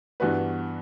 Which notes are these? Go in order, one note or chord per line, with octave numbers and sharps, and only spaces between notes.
G2 E3 B3 F#4 B4